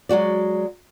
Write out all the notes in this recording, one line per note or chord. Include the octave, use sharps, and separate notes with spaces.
F#3 G#3 F#4 D5